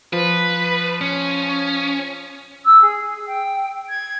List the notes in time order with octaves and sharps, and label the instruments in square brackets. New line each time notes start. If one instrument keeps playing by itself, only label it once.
[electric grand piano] F3 [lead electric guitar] B4
[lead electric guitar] C#4
[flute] E6
G#4
G5
G#6